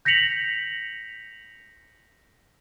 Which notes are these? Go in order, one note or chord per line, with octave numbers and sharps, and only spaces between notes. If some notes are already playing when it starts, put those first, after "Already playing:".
G6 A#6 B6 C#7 F7 F#7